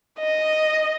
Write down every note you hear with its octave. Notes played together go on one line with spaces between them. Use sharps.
D#5